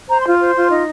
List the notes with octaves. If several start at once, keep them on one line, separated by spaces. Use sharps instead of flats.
C5 A#5
C6
F4
C6
C5
F4
D#4